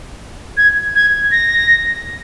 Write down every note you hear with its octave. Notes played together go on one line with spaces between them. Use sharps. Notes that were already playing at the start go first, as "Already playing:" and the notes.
G#6
G#6
A#6